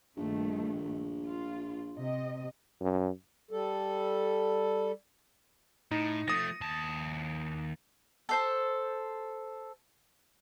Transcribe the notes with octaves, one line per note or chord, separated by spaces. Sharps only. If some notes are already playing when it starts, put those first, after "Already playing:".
A#1 G2 D#3 A3
F4
C3 D#5
F#2
G3 A4
A2 D#4
F3 A3 D#6 A#6
D#2 A5
A4 C5 A5